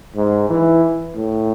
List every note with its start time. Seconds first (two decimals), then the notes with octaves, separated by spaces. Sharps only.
0.16 G#2
0.50 E3
1.16 A2